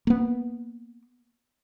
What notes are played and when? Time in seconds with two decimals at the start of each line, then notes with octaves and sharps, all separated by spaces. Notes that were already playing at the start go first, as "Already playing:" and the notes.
0.07 A#3 B3